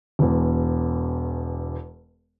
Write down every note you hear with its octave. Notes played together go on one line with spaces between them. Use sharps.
E1 E2